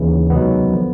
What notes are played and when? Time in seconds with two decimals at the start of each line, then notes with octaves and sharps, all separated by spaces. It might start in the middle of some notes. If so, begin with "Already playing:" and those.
Already playing: D#2 C#3 E3
0.30 C#2 C3 D#3 F#3 B3
0.72 D3 F3